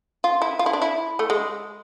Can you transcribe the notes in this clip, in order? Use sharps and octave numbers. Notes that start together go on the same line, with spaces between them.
F4
E4
F4
E4
D4
E4
A3
G#3